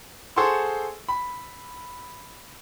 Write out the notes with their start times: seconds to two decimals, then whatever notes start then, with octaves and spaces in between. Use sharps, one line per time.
0.36 G#4 A4 C5 F#5 C6 C#6
1.09 B5